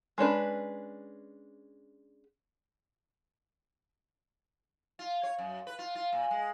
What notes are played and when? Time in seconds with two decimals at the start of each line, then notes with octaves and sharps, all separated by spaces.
0.18 G#3 C#4 D4 B4
4.99 F4
5.23 C#5
5.38 F#2
5.67 B4
5.79 F4
5.95 F4
6.12 A#2
6.31 G#3